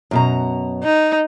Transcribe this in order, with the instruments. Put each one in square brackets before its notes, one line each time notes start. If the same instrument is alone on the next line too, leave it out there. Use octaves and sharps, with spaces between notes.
[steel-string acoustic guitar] F#2 B2 A#5
[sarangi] D#4